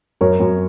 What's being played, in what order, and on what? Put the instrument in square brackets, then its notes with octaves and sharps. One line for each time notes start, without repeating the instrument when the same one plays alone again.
[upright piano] F#2 A#4 C#5
F#2